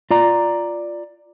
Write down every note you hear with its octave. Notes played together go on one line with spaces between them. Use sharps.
F4 D5 A#5